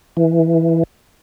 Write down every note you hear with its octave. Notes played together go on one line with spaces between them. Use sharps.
E3